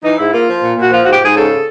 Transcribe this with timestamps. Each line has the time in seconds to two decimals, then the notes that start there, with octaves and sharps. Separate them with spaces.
0.03 E3 D#4
0.18 G#2 E4
0.32 A#3 F4
0.47 F3
0.62 A#2
0.76 A#2
0.81 F#4
0.90 F3 F4
1.02 F#4
1.05 G#2
1.12 G4
1.20 G#2 G#4
1.35 C#3 A4